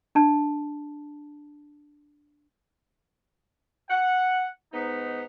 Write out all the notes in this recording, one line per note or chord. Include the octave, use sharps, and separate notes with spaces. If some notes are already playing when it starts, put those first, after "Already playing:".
D4 A5
F#5
G#2 B3 D#4